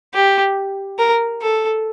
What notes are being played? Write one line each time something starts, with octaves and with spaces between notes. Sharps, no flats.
G4
A#4
A4